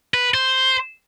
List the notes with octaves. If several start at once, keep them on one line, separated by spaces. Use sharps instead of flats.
B4
C5